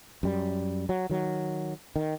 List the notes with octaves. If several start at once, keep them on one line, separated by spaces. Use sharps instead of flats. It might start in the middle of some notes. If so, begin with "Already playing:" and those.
F#2 G3
F#3
D#3 F#3
D#3